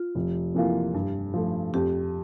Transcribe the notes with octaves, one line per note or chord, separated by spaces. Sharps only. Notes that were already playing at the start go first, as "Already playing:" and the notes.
Already playing: F4
F1
F2 E3 A#3 F4
G2
F3 A3
F2 G4